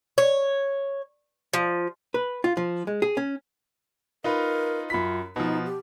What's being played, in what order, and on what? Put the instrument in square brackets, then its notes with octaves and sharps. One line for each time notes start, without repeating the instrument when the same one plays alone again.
[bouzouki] C#5
F3
[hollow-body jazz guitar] B4
F4
F3
G#3
G#4
C#4
[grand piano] D#4 F4 B4 [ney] A#4
[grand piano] F#2 B5 B6 [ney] F4
[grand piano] B2 F3 [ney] D#4
[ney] G4